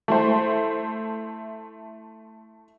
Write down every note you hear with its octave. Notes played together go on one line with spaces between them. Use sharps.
A3 E4 C5